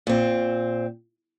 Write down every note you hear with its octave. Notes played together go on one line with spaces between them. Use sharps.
A#2 C4